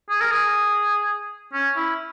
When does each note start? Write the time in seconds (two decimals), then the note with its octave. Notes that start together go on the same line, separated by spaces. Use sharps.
0.09 G#4
0.21 A#4
0.32 G#4
1.53 C#4
1.76 E4